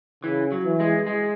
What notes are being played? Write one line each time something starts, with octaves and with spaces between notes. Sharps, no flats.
C#3 E3
F#3
E3
G#3
G#3